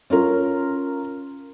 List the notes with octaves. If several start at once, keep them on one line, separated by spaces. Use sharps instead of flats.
C#4 F4 A#4